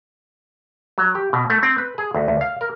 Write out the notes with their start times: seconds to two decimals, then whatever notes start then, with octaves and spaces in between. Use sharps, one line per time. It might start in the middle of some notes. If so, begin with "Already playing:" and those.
0.98 F#3
1.15 G4
1.33 B2
1.50 A3
1.63 C4
1.78 B4
1.98 G#4
2.15 D2
2.28 D2
2.41 F5
2.61 A#4